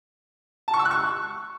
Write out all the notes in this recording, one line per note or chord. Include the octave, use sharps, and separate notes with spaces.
A5
C#6
E6
F#6
C#6